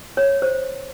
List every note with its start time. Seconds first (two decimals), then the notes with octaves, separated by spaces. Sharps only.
0.17 C#5
0.42 C5